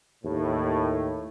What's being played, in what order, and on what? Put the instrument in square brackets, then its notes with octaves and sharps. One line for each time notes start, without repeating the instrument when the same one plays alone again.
[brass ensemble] D#2 A2